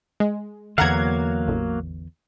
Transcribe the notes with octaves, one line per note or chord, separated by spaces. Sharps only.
G#3
E2 D3 F#3 A#3 F5 F#5 A#5 G#6
A1